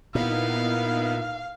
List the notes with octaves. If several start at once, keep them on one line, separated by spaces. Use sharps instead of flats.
A#2 B3 D#4 E4 F5